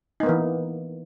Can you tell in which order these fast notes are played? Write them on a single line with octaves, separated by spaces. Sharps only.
D#4 A#3 B3 E3